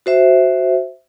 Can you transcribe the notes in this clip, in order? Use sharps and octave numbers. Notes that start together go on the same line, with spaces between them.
F#4 C5 E5